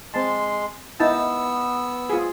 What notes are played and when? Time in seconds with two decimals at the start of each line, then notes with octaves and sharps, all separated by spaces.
0.14 G#3 C4 A5 C6
1.00 B3 D#4 E4 A5 E6
2.10 F4 G#4